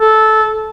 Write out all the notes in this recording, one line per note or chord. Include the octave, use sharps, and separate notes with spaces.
A4